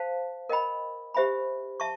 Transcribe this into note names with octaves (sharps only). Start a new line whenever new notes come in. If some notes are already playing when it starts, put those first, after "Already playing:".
Already playing: C5 F5 A5
A#4 D#5 G5 B5
G4 C5 E5 G#5 B5
E5 A5 C#6